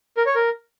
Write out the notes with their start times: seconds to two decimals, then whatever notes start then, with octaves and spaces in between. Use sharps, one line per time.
0.17 A#4
0.26 C#5
0.35 A#4